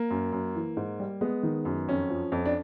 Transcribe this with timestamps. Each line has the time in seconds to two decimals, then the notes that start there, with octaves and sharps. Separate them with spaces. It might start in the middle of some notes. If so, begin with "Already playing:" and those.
Already playing: A#3
0.11 F#2
0.33 F#2
0.55 E3
0.77 G#2
1.00 G3
1.21 G#3 B3
1.43 D#3
1.65 F#2
1.88 F2 C#4
2.10 F3
2.32 F2
2.46 D4